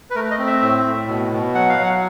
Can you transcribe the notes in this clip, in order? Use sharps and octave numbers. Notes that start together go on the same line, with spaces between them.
B4
A3 A#4
D#5
C4
E5
A2
A2
B2
B2
F#3 F#5
F5
F#3 F#5